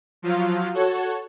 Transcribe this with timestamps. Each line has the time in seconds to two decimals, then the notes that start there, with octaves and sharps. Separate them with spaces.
0.22 F3 F#3 F4 F5
0.74 F#4 A4 C#5